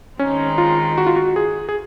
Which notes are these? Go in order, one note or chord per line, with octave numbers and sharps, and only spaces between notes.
D#3 G#3 C4 C#4 D#4
F4
F#4
F4
F#4
G#4
G#4